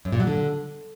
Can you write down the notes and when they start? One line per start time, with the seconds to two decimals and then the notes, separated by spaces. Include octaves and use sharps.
0.05 F#2
0.13 A#2
0.20 F#3
0.27 D3